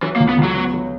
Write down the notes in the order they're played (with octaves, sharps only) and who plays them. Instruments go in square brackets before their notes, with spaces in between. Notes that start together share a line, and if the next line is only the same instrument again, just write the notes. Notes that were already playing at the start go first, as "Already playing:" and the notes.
[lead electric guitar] E3 [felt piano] F#3
[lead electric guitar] A#3
[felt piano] C#2
[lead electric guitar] B3
[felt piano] C#2 [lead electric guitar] F#3
[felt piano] B3
F#3